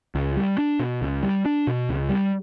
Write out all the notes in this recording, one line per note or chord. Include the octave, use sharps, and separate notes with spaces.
C#2
G3
D4
B2
C#2
G3
D4
B2
C#2
G3